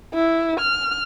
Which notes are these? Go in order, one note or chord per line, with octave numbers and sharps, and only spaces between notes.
E4
F6